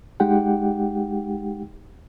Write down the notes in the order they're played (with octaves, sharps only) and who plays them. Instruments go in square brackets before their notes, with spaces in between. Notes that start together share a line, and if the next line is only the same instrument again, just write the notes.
[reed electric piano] G#3 D#4 G4 F#5 G5